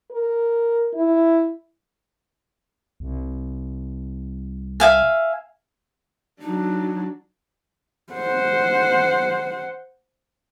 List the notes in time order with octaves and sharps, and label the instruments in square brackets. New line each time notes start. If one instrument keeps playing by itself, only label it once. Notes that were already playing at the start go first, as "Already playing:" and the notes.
[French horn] A#4
E4
[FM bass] C2
[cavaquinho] E5 F5 G#5
[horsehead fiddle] F#3 D4 [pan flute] D#4
[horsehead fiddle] C5 F#5